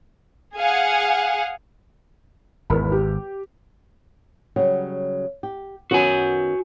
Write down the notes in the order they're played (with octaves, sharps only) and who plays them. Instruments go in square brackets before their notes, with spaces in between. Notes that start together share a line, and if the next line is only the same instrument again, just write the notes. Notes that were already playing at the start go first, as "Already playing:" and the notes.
[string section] G#4 F5 F#5 G#5
[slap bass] G#1 [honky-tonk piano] E2 A#4 B5
[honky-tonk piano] G4
[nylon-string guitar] C#3 F#3 G3
G4
[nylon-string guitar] D#3 B3 C#4 [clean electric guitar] F#4 G#5